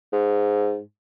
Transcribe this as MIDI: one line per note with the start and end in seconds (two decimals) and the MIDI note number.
0.13 0.79 44